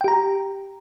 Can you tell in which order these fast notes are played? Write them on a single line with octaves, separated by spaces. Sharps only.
G5 G4 A#5